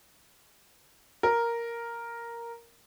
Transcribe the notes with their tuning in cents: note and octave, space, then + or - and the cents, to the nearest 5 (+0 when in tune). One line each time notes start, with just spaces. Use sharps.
A#4 +0